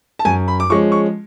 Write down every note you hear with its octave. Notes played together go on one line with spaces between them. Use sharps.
A5
F#2 G#5
B5
D6
F3 G#3 C#4 C#6
C#6